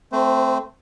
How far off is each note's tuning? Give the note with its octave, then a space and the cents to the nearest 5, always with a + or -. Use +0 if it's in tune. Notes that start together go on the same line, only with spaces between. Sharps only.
A3 +0 C4 +0 C5 -30